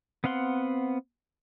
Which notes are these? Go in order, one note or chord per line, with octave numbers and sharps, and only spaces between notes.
B3 C4 F5 F#5 C6